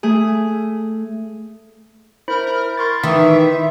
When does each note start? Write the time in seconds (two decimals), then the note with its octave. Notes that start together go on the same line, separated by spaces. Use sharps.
0.03 A3 G#4
2.28 E4 A#4 C5 B5
2.77 A#4 C6 C#6 A6
3.03 D#3 E3 E5 B6